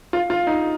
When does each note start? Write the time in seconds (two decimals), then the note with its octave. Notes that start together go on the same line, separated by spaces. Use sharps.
0.13 F4
0.30 F4
0.47 D#4